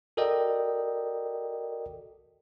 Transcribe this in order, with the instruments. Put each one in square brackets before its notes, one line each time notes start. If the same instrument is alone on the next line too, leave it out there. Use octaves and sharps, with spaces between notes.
[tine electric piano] F#4 A4 A#4 D5 D#5 G5